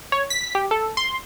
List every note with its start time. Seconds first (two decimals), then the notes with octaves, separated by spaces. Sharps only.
0.12 C#5
0.30 B6
0.55 G4
0.71 A4
0.97 C6